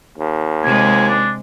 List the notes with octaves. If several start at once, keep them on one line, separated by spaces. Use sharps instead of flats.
D#2
C3 G#3 G#5
D4